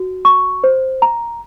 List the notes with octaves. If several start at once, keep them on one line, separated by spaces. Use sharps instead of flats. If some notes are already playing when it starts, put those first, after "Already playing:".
Already playing: F#4
C#6
C5
A#5